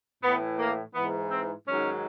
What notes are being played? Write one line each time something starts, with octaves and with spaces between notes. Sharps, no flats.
A2 E3 B3
A#3
G#2 E3 B3
C4
G#2 D#3 F#3 C#4